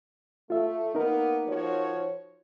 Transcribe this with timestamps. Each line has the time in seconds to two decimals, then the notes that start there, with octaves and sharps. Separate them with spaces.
0.50 A3 F4 E5
0.95 A#3 B3 D#4 A#4
1.47 F3 F#4 C#5